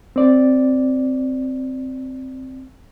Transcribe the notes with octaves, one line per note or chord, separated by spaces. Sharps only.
C4 D5